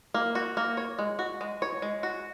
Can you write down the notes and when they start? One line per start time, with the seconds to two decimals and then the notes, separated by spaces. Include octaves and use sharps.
0.14 A#3
0.35 F#4
0.57 A#3
0.77 C#5
0.99 G#3
1.19 F#4
1.41 G#3
1.62 C#5
1.82 G#3
2.03 F#4